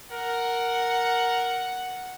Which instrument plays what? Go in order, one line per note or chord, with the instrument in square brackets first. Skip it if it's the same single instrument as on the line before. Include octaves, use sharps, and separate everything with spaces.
[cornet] A#4 [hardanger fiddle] F#5